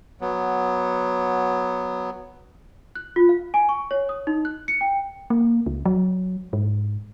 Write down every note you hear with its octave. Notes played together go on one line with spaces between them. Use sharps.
F#3 B3
F#6
F4
F5
G#5
C#6
C#5
D#6
D#4
F#6
C#7
G5
A#3
C#2
F#3
G#2